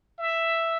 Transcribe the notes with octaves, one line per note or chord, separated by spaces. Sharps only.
E5